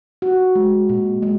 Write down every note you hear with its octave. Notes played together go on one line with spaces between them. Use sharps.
F#4
G#3
A#2
G#3